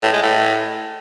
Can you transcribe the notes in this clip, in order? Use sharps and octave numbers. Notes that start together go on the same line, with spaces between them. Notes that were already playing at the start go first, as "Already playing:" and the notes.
A2
G#3
A2